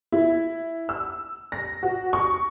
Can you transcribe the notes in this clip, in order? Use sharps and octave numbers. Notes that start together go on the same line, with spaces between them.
E4
E6
A#6
F#4
C#6